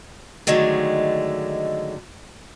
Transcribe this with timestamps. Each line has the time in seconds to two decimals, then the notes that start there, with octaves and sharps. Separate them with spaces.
0.47 D3 D#3 F#3 G#3 A3